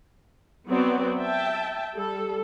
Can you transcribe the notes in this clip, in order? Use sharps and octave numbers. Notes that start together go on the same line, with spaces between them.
F#3 B3 C4 F#4 D5
E5 G5 A5
G3 A4